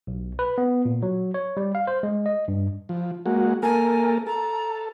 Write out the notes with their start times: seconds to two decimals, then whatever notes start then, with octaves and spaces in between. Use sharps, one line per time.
0.07 B1
0.39 B4
0.58 B3
0.85 A#2
1.03 F#3
1.34 C#5
1.57 G3
1.75 F5
1.87 C5
2.03 G#3
2.26 D#5
2.48 G2
2.89 F3
3.26 G#3 A#3 F#4
3.63 A#3 A4 A#4 G#5
4.27 A4 A#5